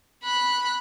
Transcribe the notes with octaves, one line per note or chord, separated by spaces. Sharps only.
B5 F#6